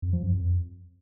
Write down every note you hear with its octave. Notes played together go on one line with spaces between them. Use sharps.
F2
F3
F#2
F2